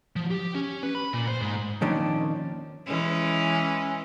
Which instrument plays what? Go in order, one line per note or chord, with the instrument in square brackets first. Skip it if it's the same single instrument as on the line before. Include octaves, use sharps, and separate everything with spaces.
[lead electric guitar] F3
G4
C#4
B4
B5
A#2
C5
G#2
[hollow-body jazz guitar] F2 A#2 D#3 C#4 D4
[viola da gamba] E3 G#3 C#4